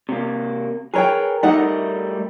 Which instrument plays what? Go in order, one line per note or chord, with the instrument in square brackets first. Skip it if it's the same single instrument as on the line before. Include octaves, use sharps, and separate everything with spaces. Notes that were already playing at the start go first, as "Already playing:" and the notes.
[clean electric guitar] C3 A#3
[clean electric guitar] G#4 A#4 [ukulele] B4 C#5 G5
[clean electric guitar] G3 A3 A#4 [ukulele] D#4 F#5